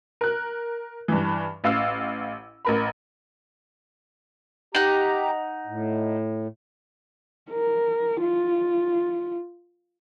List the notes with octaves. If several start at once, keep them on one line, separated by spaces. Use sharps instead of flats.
A#4 F#6
G2 E3
A1 F5 E6
A1 A#4 B5
D#4 G4 F#5 A#5
A2
A#4
F4